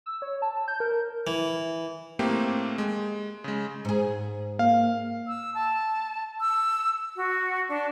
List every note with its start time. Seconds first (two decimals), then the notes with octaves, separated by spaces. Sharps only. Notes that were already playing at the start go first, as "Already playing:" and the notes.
0.06 E6
0.22 C#5
0.42 A5
0.68 G6
0.80 A#4
1.27 E3
2.19 A2 A3 A#3 C4 G4
2.78 G#3
3.44 C#3 G#3
3.85 G#2 G#4
4.59 A#3 F5
5.27 E6
5.54 A5
6.40 E6
7.16 F#4
7.68 D4